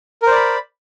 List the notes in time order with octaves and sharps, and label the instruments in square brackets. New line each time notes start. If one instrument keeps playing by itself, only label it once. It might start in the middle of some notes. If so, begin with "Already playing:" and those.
[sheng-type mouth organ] A#4
C5
D5
B5